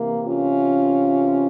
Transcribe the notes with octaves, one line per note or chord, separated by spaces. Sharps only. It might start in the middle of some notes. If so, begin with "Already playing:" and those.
Already playing: C3 E3 A#3
C#4 F4